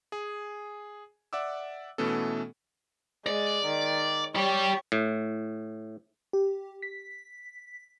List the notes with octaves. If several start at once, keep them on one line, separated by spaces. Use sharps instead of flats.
G#4 G#5
D5 E5 F#5 D6 E6
B2 E3 A3 B3 C#4 A4
G#3 D5
D#3
G4 C#5 D5
A2
G4
B6